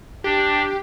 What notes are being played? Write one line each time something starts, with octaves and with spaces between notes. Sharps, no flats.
D4 G4